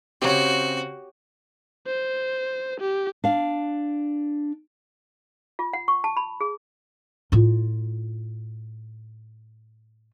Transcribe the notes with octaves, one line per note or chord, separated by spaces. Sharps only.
C#3 C4 F#4 G4 C#5
C5
G4
D4 F5
F4
F#5
C#6
A5
B5
G#4
A2 F4